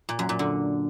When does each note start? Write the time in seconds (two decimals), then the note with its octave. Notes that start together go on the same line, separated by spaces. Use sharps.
0.09 A#2
0.19 F#2
0.29 A#2
0.39 D3